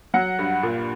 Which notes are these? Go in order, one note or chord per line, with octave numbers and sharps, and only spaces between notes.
F#3 F#5
G2
A#2